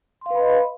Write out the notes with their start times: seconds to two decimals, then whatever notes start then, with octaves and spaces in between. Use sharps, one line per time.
0.21 C6
0.26 F5
0.31 B4
0.35 B5
0.40 D#5